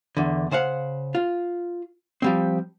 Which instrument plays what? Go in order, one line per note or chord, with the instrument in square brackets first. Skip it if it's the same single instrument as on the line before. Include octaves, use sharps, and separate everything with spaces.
[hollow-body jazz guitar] E2 D3
C#3 C5 F5 F#5
F4
F3 G3 C4